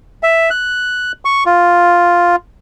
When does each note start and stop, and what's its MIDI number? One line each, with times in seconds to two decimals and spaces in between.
0.23 0.50 76
0.50 1.12 90
1.25 1.44 85
1.46 2.36 65